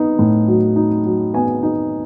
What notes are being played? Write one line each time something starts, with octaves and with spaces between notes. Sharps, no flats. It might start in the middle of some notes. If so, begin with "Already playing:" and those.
Already playing: B3 D#4
A2
F#3
D#4
F#3
B3 G#5
D#4